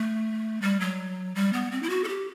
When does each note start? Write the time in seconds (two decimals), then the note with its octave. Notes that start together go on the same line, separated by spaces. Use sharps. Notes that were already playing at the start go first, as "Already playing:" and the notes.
Already playing: A3
0.62 G3
0.80 F#3
1.35 G3
1.53 B3
1.71 C4
1.83 E4
1.90 F#4
2.04 A4
2.08 G4